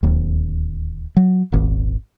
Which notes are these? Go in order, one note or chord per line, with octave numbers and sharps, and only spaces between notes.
D1 D#2
F#3
D#1 G#1